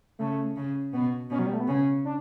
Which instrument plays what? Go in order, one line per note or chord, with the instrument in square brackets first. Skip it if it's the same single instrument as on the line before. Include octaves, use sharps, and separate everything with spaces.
[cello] C#3 [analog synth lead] A3
[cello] C#3
[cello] B2 [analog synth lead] B3
[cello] B2 [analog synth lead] C#4
[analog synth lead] F#3
G3
A3
B3
[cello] C#3 [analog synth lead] C#4
[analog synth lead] D4